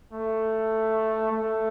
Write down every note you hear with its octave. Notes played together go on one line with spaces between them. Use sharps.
A3
A3